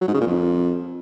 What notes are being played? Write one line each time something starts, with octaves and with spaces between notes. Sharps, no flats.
F#3
G#2
C#3
A#2
F2